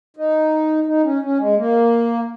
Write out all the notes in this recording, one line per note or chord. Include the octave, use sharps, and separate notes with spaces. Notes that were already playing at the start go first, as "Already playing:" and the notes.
D#4
D#4
C#4
C#4
G#3
A#3